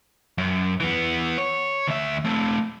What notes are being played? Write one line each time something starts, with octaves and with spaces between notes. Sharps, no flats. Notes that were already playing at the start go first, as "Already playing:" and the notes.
F#2
E3 B3
C#5
D2 E5
A3 C4